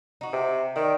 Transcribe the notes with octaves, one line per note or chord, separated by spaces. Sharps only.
D#4 F#4
C3
D#3 D5